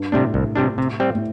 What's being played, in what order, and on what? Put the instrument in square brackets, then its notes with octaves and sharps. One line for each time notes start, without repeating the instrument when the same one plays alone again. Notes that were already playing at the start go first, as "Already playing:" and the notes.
Already playing: [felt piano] G2
[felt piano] A2 [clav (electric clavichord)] C3 G3 D4
[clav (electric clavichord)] C2
C3 G3 D4
C3
G3 C4
[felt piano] A2